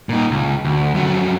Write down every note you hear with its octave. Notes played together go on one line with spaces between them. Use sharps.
A#2 D#4
C#2
D2
F2 F#3